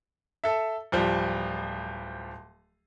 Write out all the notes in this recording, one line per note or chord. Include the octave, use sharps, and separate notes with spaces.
A4 E5
D1 F3 G3